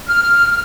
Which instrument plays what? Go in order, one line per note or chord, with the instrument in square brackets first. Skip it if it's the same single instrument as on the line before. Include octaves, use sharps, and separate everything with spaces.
[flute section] F6